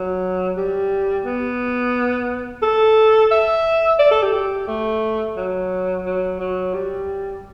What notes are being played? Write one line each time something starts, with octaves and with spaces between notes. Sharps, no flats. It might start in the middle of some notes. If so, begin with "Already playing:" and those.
Already playing: F#3
G3
B3
A4
E5
D5
A4
G4
G4
A3
F#3
F#3
F#3
G3